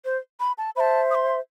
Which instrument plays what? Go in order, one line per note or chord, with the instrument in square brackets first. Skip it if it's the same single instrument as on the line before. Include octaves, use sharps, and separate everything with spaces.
[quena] C5
B5
A5
[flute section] C5 E5 [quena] B5
[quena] A5
D#6
C6